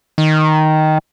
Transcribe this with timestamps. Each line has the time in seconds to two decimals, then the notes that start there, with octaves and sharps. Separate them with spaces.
0.18 D#3